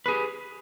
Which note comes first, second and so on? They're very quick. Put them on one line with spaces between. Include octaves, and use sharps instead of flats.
B4 G#4 G4